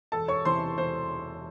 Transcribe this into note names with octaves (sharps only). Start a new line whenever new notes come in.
E1 A4 A5
C#5 C#6
E2 C3 E3 C5 C6
E1 C5